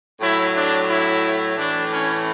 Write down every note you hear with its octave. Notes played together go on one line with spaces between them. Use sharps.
A2 F#3 E4
D4
E4
A2 E3 D4
C#4